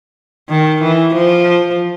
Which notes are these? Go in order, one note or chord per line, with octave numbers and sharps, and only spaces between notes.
D#3
E3
F3